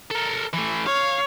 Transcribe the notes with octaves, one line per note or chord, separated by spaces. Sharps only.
A4 A#4
E3 A3
C#5 F5